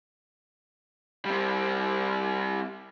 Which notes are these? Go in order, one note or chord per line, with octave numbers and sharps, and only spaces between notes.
G3 C4